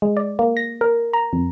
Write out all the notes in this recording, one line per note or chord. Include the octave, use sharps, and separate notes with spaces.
G#3
D5
A#3
A#6
A#4
A#5
F2